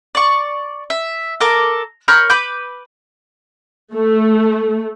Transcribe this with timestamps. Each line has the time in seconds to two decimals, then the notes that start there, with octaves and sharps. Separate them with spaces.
0.15 D5 C#6
0.90 E5
1.40 A4 A#4 D6
2.08 A#4 C#5 B5 G6
2.30 B4 B5 D6 G6
3.94 A3